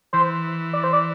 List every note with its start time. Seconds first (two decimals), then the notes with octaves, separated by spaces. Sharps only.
0.13 E3 C5
0.73 D5
0.84 C5
0.93 D5